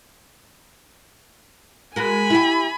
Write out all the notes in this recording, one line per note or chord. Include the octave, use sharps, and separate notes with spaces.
G#3 F#4 A#4 G#5 B5
E4 F#4 G4